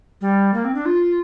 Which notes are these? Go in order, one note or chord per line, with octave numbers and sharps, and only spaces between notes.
G3
A#3
C4
D4
F4